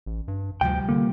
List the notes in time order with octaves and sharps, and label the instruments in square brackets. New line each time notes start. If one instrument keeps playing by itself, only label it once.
[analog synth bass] A1
G2
[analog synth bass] D2 [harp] C3 F3 G3 [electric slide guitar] G5
[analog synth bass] D3 [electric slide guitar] A#3